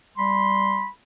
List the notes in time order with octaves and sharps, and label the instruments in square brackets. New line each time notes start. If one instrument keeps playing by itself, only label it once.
[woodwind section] G3 B5 C6